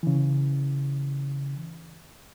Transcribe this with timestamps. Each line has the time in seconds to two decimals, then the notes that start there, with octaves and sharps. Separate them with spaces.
0.03 C#3 E3